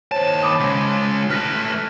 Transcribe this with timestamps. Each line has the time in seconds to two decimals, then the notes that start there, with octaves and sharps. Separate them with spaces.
0.12 D#2 C5 C#5 A5
0.43 B5 D6 D#6
0.60 C#3 G#3
1.30 A3 B4 F6 A#6